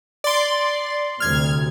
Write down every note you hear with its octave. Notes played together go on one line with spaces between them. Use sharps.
D5 C6
D2 C3 F6 G#6